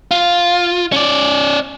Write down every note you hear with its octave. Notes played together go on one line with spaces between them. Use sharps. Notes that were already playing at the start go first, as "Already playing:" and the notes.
F4
C#4 D5